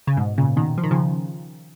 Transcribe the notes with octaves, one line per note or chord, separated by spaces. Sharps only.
C#3
G#2 B2
A#2 C#3
B2 D#3
F3
D#3
C#3 F3